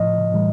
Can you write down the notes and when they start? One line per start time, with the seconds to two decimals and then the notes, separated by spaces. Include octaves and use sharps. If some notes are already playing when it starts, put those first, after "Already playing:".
Already playing: A2 F3 D#5
0.32 A2 E3 G3